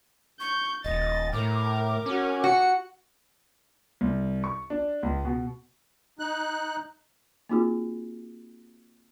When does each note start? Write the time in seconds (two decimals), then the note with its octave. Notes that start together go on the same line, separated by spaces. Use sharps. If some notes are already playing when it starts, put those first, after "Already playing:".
0.40 C#6 G6
0.84 D#1 D#5 A6
1.33 A2 A#4 A#5 D6
2.06 C#4 F#4 A#4
2.44 F#4 C#7
4.01 C2
4.44 C#6
4.70 D4
5.03 C#2
5.25 B2
6.19 D#4 F#6
7.49 A#3 C4 D#4 F4 F#4 G#4